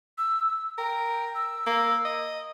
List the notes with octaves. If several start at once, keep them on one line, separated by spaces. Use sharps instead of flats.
E6
A#4 G5
E6
A#3
D#5